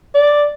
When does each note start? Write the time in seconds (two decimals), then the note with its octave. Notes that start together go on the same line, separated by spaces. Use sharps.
0.15 D5